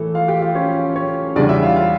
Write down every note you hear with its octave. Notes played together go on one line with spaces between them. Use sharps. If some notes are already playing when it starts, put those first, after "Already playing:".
Already playing: A2 E3 A3 A4
F4 F5
G4 G5
F4 F5
C#4 C#5
C#4 C#5
E2 C#3 G3 D4 D5
E4 E5
F4 F5
F4 F5